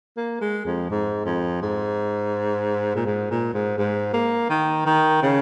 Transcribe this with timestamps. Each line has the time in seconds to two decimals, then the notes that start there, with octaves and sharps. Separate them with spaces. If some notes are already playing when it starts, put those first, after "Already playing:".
0.17 A#3
0.41 G#3
0.65 F2
0.90 G#2
1.26 F2
1.62 G#2
2.95 A#2
3.06 G#2
3.30 A#2
3.54 G#2
3.78 G#2
4.13 A#3
4.50 D#3
4.86 D#3
5.22 C#3